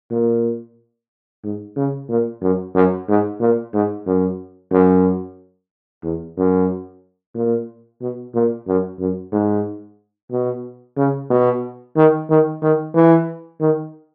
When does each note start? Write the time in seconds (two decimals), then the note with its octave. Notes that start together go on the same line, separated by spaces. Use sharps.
0.11 A#2
1.44 G#2
1.77 C#3
2.09 A#2
2.42 F#2
2.75 F#2
3.08 G#2
3.40 A#2
3.73 G#2
4.07 F#2
4.72 F#2
6.03 E2
6.37 F#2
7.35 A#2
8.02 B2
8.35 A#2
8.67 F#2
8.99 F#2
9.32 G#2
10.31 B2
10.97 C#3
11.30 B2
11.96 D#3
12.30 D#3
12.62 D#3
12.94 E3
13.60 D#3